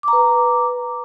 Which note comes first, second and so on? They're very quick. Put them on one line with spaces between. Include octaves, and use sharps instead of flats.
D6 A#5 B4